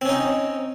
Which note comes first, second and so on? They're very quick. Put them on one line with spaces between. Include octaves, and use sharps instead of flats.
C4 C#4 D#4